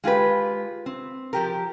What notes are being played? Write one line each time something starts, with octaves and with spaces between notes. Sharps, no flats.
G#3 F4 G4 B4
C4
F3 G4 A#4